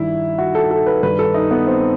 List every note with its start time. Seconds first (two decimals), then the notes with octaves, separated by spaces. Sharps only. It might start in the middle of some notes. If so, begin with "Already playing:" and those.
Already playing: G2 D#3 E4
0.38 F#4
0.55 A4
0.71 A4
0.87 B4
1.03 G2 D#3 B4
1.19 A4
1.34 D#4
1.51 B3
1.67 C4